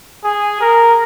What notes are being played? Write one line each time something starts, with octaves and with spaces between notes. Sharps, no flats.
G#4
A#4